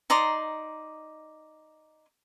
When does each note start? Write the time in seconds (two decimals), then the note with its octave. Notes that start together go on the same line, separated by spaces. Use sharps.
0.10 D#4 D5 A#5 C6